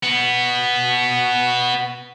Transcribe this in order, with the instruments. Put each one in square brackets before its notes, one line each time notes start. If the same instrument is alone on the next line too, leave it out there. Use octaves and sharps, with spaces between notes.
[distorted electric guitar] B2 B3